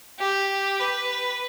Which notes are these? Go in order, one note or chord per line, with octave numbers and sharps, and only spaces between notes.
G4
B4